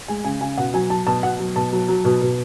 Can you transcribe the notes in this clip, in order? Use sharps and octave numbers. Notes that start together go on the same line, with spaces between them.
G#3 G#5
C#3 G#5
C#3 G#5
B2 F#5
F#3 G#5
F#3 A5
B2 A5
B2 F#5
F#3
B2 A5
F#3
F#3
B2
B2